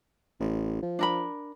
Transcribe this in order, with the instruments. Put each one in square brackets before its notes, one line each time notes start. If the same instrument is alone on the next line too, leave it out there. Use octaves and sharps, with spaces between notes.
[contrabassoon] A1
F3
[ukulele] D4 A#4 B5